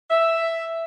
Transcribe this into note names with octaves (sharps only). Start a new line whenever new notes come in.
E5